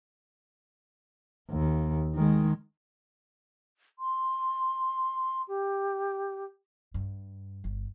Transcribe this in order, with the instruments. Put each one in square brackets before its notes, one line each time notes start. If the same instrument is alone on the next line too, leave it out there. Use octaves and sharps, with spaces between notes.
[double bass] D#2
D#3 G#3
[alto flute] C6
G4
[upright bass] G2
G1